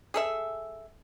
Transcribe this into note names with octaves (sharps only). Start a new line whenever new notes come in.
G#4 A4 E5